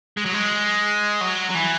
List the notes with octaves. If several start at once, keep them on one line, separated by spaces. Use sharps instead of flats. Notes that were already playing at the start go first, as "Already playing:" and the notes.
G#3
F#3
G#3
F#3
F#3
E3